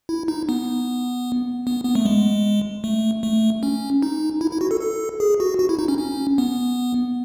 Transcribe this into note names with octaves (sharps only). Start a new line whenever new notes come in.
E4
D#4
B3
B3
B3
A3
G#3
A3
A3
C#4
D#4
E4
E4
F#4
A4
A4
G#4
F#4
F#4
E4
D#4
C#4
C#4
B3